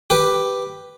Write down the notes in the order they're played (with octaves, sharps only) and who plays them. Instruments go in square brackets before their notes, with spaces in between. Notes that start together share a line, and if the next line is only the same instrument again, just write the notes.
[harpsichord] G4 B4